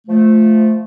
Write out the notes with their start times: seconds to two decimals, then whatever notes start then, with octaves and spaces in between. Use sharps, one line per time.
0.07 F3 A3